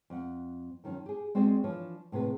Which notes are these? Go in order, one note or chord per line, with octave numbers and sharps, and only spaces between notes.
F2 F#5
F#2 D#3 F3 C#4
G4 G#4
G#3 C4 F#4 G#4 D5 D#5
E3 F3 D4 C#5
A2 C3 G#4 B4